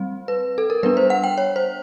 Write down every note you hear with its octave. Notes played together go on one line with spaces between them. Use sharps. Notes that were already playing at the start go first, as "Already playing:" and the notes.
Already playing: G3 C4
B4
A4
A#4
G3 B3 D4 B4
C5
F#5
G5
C#5
C5